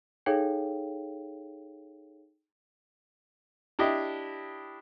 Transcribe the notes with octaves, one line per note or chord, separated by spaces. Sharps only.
D#4 G#4 A4 C#5 F5 G5
D4 E4 G4 D#5